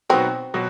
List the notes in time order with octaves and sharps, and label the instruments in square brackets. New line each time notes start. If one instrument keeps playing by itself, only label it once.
[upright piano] B2 F#3 B3 D#4 F#4 [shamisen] C4
[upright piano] B2 F#3 F#4